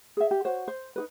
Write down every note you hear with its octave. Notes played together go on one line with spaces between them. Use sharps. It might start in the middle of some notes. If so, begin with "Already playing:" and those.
G#4 E5
G4
F#4 C5 C#5 F#5
C5
D#4 G4 B4